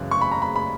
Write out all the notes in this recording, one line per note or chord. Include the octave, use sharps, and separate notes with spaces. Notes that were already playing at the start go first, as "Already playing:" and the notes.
Already playing: F#2 C#3 E3 F#6
C#6
B5
A#5
B5
B5